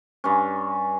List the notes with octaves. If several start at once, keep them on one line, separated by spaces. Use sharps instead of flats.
G2 C#4